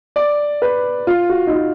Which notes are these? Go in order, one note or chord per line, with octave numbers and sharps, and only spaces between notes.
D5
B4
F4
F#4
D#4
F4